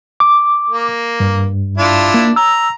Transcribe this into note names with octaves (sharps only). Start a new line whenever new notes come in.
D6
A#3
G2
D4 E4 F4
A#3
A#5 E6